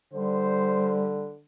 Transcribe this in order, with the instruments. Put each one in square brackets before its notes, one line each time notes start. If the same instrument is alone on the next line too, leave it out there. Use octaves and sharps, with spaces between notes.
[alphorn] D3 [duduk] G3 [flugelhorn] C5